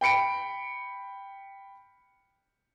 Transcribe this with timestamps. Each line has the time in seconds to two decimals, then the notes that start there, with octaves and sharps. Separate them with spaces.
0.01 G5 B5 C#7 D7